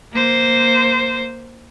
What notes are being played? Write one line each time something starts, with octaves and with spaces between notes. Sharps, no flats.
A#3 C5